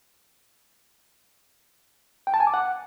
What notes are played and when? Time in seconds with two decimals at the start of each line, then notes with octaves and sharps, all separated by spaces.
2.27 G5
2.34 A5
2.40 G#5
2.47 D6
2.54 F#5